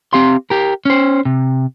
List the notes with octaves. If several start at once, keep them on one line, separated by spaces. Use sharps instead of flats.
C4 G4 F5 C6
G4 A#4
C#4 C5
C3